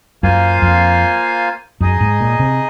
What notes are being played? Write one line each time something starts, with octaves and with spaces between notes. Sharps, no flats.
F#2 A#3 F4 C5 F5 G#5
F2
F#2 D#4 G#4 D#5
G#2
A#2
C3